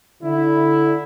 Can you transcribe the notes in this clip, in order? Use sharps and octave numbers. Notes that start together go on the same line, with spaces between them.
D3 E4